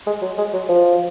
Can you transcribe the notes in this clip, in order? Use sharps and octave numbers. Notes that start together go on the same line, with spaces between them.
G#3
F#3
G#3
F#3
F3